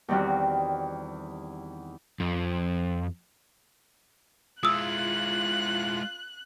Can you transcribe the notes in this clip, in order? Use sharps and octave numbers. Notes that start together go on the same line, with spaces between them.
E2 D#3 G3 C4 F#4
F2
G#3 E4 F4 D#6 E6 F#6